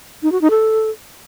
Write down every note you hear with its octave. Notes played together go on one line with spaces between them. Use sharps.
D#4
F#4
D#4
A4